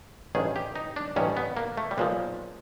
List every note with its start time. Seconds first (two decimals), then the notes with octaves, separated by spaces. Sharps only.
0.35 A1 G2 D#3 G#4
0.56 G4
0.76 D#4
0.96 D4
1.16 A1 G2 D#3 C#4
1.37 B3
1.57 A#3
1.77 A3
1.91 G3
1.98 B1 A#2 F3 G#3